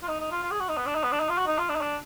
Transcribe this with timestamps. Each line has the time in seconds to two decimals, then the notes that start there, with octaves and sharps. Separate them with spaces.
0.03 F4
0.08 D#4
0.20 D#4
0.31 F4
0.43 F4
0.51 G#4
0.60 F#4
0.69 D#4
0.77 B3
0.86 D4
0.95 D#4
1.04 B3
1.12 D4
1.20 D#4
1.29 F4
1.38 F#4
1.47 D#4
1.58 F4
1.70 D4
1.76 D#4
1.81 D4